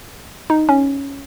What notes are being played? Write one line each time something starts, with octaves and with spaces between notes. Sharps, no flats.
D#4
C#4